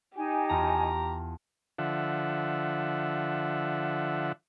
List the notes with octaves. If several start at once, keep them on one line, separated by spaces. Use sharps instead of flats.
D#4 G4 G#5
E2 F4 A5 A#5
D3 F3 E5 F#5